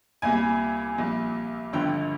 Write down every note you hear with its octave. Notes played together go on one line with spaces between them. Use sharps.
C2 A#2 G3 G#5
A#1 A#2 G3
G#1 G2 D3 F3 G5